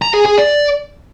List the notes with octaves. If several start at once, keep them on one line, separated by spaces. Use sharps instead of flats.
A#5
G#4
G#4
D5